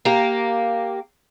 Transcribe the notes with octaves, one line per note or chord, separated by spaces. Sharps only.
A#3 G4